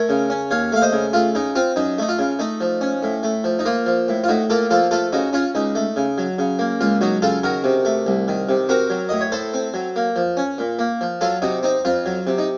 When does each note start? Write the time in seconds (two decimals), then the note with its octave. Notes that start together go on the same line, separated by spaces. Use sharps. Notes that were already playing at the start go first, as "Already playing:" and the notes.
Already playing: A3 A#4 C#5
0.09 C#3
0.30 C#4
0.51 D#2 C#5 F5
0.72 A3 F5
0.82 C5 D#5
0.93 C#3
1.13 A3 F4
1.35 C#3 D#4
1.55 C4 F4
1.76 F#2 D#4
1.98 A3 D#4
2.09 F4
2.19 C#3
2.39 A3 D#4
2.61 F3
2.81 C#4
3.03 A2
3.23 A3
3.44 F3
3.59 D#4
3.65 A#3 F4
3.86 F3
4.08 A2
4.24 F4
4.28 A2 D#4 F#4
4.50 A#3 F4 A4
4.70 F3 F4 A4
4.91 A3 F4 A4
5.13 C#3 D#4 F#4
5.33 C#4 F4
5.55 C#2 D#4
5.75 A3
5.96 C#3
6.18 F#3
6.39 C#3
6.59 A#3
6.81 C#2 F4
7.01 F#3 D#4 F#4
7.22 C#3 F4 A4
7.43 D#3 F#4 A#4
7.64 C3
7.85 A3
8.07 C2
8.28 D#3
8.49 C3
8.69 C4 F#4 A#4
8.90 F#3
9.09 A2 D#5
9.21 C#5
9.32 A2 A4 C5
9.54 C4
9.74 F#3
9.96 A#3
10.16 F3
10.37 C#4
10.58 A#2
10.79 A#3
11.01 F3
11.21 F#3 F4 A4
11.42 C3 D#4 F#4
11.63 C4 D#4
11.85 F2 F4
12.06 F#3
12.27 C3
12.38 D#4